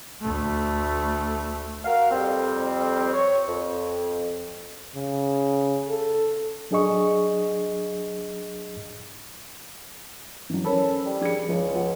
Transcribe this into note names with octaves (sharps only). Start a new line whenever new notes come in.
D2 A3
F#4 A#4 F5
F2 G3 C4
C#5
F2
C#3
A4
F#3 D4 G#4 D#5 C#6
E3 F#3
C#4 A4 A#4 C5 C#5 B5
G3
F3 D4 G#4 C#7
C#2 F3
F4 F#5